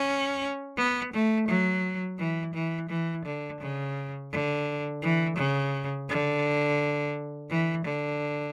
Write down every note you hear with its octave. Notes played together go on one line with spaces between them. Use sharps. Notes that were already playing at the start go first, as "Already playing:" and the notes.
Already playing: C#4
B3
A3
F#3
E3
E3
E3
D3
C#3
D3
E3
C#3
D3
E3
D3